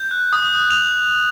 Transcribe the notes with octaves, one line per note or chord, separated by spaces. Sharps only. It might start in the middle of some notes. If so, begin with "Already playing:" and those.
Already playing: G6
F#6
D#6
F#6
F7